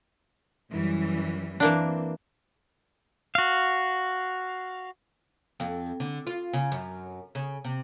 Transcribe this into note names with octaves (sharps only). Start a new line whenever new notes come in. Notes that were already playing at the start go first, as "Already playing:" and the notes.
F#2 E3 G3
E3 A#3 C4 D4
F#4 F5
F2
D3
F4
C#3
F#2
C#3
C3